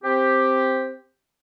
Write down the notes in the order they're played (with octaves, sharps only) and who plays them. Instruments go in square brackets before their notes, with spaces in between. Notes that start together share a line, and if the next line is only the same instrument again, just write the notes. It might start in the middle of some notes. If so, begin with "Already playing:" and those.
[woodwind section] C4 G4